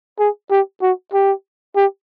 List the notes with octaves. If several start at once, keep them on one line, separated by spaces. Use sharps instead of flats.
G#4
G4
F#4
G4
G4